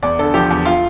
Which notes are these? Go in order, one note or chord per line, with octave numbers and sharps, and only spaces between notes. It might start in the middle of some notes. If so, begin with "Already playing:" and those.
E2 D5
D3 A4
F3 G4
E2
F4